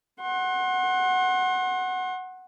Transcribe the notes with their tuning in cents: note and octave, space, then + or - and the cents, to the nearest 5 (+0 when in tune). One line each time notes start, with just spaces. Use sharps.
F#5 +0 C6 +35